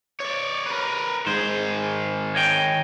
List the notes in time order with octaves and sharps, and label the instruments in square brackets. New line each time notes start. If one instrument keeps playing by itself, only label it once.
[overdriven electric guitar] C#5 D5
A#4 B4
[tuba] G#2 [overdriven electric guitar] D#3 G#4 [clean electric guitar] C5
[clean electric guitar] C#5 D#5 G5